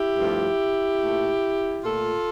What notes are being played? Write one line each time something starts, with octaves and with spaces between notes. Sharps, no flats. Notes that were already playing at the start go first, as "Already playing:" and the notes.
Already playing: E4 G4
G2 F3 A3
A#2 A3
A#2 A3 F4 A4